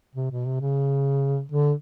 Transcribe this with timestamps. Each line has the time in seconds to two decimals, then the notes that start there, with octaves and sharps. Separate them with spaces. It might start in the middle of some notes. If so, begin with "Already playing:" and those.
0.15 C3
0.31 B2
0.46 C3
0.61 C#3
1.52 D3